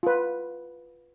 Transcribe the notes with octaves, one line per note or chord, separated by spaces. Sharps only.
F4 B4